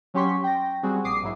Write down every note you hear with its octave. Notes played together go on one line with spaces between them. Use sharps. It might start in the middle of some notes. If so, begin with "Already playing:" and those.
F#3 C#4 G4 C6 C#6 B6
G5 A#6
G3 C4 F#4 G#4
A#1 D6 D#6 C7
A#1 G#2 F#3 E4